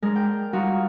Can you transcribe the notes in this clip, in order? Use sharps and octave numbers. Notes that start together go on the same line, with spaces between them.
G#3 D4 A#4
G5
G3 D#4 F4 F#4 A#4